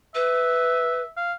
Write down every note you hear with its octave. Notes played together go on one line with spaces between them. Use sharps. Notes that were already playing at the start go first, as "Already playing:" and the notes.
B4 E5
F5